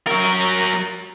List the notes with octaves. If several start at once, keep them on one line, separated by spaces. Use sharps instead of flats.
F#3 A#4